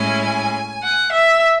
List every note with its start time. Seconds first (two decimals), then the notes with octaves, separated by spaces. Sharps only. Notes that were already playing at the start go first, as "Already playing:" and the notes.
Already playing: A2 G#3 C#4 E4 G#5
0.82 F#5
1.12 E5